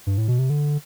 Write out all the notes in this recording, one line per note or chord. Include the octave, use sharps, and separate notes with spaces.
G2
A2
B2
C3
D3